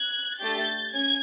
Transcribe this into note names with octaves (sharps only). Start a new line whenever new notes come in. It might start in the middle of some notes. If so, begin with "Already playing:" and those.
Already playing: F#6 G#6
A3 D4 G4 G6 A6
C#4 G#6